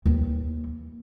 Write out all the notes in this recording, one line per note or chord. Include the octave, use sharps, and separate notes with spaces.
D#2 E3